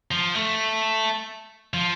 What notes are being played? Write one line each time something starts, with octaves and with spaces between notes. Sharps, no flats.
F3
A3
F3